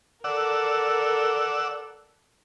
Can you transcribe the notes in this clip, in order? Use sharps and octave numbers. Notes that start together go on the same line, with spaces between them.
A4 A#4 D5 F#5 E6